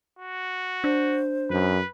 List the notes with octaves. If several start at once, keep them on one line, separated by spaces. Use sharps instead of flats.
F#4
D4 C5
F#2 B4